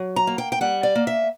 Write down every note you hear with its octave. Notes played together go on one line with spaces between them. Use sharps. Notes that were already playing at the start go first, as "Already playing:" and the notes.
Already playing: F#3
A#5
A#3
G5
G5
G3 F#5
D5
A#3
E5